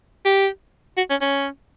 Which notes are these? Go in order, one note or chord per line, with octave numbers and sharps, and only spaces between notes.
G4
F#4
C#4
C#4